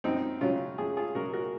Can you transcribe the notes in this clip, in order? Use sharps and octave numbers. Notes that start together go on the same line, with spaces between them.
F#2 C4 D#4
C#3 F#3 C#4 F4
F#2 F4 G#4
F4 G#4
C#3 F#3 F#4 A#4
F#4 A#4